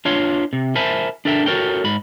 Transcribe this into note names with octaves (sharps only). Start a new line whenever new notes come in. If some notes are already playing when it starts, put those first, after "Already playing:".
D4 F4 C#5 F5 C6
C3
A#4 C5 E5 G#5 A5 B5
D4 A4 A#4 E5 G5
F#4 A4 A#4 C#5 G5
G#2 B5